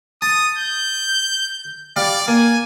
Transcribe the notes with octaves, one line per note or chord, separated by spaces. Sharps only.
A5 D#6
G6
G3 D5 F5
A#3 G#5